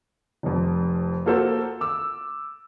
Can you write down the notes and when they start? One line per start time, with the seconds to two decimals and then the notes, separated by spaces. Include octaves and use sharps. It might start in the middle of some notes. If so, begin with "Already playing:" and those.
0.43 F1 F2
1.26 A#3 F4 F#4 A4 A#4 C5
1.81 D6 E6